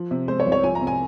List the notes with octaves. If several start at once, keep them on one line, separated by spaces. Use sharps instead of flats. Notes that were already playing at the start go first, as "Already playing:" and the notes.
Already playing: F3
C3
G#3 C5
C#5
C2
C#5
F3 G#5
A#5
C3
G#5